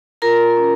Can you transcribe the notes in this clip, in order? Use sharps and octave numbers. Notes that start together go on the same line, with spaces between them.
F4 A#4 A#5
C#4